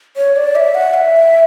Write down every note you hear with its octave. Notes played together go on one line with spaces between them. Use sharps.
C#5
D5
E5
F#5
E5